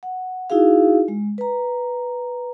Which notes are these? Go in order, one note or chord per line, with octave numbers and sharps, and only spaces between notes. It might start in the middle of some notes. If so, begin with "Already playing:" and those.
F#5
D#4 E4 F#4 G#4 F5
G#3
B4 A#5